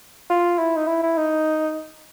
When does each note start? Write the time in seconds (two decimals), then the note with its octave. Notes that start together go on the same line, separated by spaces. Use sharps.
0.30 F4
0.59 E4
0.76 D#4
0.87 E4
1.03 E4
1.17 D#4